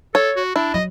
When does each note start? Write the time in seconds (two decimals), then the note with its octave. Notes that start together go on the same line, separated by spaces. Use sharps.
0.15 A4 C#5
0.36 F#4
0.56 D4 E4
0.74 F#3 D#5